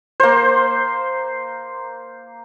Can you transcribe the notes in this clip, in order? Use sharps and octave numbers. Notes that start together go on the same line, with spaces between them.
A#3 C5